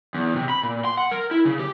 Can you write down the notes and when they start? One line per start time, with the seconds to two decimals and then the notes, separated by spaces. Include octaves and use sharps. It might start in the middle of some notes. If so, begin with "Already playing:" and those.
0.15 E2
0.36 C3
0.49 B5
0.63 A#2
0.85 C6
0.98 F#5
1.11 A#4
1.31 E4
1.45 C#3
1.60 G4